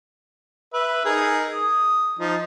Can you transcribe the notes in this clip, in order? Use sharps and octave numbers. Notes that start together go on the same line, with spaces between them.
B4 E5
D#4 G#4 A#4
D#6
F3 D#4